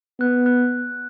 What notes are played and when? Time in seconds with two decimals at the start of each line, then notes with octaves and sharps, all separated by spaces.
0.20 B3 F#6
0.46 F#6